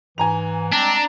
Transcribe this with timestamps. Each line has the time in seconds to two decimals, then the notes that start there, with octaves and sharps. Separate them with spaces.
0.18 G#2 E3 G#5 A#5 F7
0.73 G3 G#3 C4 D4 A#5